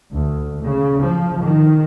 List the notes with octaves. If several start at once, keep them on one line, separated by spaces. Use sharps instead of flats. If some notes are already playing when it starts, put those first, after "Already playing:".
D2
C#3
F3
D#3